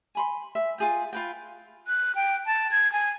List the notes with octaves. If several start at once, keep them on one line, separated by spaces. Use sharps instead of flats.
G#5 B5 C6
E5
F4 G#4 G5
F4 B4 G5
F#6
G5
A5
G#6
G#5